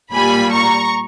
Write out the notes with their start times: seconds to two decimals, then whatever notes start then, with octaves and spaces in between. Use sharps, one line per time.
0.13 A#2 G3 G#5 B5
0.53 A#5 C#6